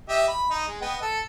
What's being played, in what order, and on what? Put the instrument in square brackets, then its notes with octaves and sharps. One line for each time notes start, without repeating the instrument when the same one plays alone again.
[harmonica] G4 D#5 E5
B5
D#4
G#3
B3 D#5 G5
A4